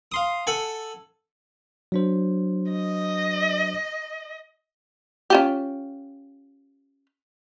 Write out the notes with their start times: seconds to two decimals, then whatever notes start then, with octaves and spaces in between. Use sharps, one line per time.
0.12 F5 C6 D#6
0.47 A4 F#5 G#5
1.92 F#3 D4 C5
2.72 D#5
5.30 C#4 F4 G4